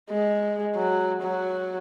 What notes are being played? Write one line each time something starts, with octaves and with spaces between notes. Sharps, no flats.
G#3
F#3
F#3